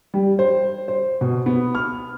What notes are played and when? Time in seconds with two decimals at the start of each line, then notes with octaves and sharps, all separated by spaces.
0.14 G3
0.39 C5
0.88 C5
1.21 B2
1.46 B3
1.75 F6